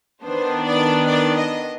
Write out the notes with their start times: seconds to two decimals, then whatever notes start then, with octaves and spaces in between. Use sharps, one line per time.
0.24 D#3 B3 D4 C5
0.66 D5
1.08 D5
1.36 D#5